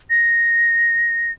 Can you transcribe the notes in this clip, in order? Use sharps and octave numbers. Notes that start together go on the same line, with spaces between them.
A#6